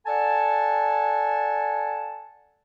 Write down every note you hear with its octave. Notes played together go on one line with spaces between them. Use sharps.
A4 D5 F#5 G#5 A5